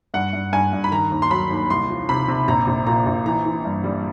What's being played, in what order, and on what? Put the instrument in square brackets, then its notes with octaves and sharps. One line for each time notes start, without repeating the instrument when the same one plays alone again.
[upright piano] G2 F#5
G2
G2 G#5
G2
B5
D#3 A#5
D#2
C6
F#3 B5
D#2
C2 C6
F3
C3 B5
C3
A#1 A#5
A#1
A#2 A#5
A#1
E3 A#5
E3
G2
G3